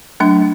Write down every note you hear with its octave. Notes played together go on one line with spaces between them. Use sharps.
F#3 A3 D4